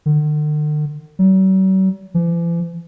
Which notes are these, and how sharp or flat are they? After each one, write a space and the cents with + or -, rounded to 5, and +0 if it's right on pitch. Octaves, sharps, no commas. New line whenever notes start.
D3 +45
F#3 +45
E3 +45